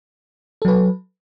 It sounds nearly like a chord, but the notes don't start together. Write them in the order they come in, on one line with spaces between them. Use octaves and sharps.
A4 F#3 B4